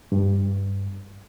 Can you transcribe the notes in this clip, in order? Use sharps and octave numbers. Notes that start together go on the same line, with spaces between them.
G2